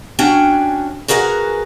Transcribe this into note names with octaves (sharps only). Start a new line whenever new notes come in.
C#4 D4 F#4 G5 G#5
F#4 G#4 A#4 B4 F5 G#5